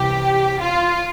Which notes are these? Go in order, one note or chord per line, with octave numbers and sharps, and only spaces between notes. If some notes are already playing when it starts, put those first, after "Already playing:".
Already playing: C2 C3 E3 G4
F4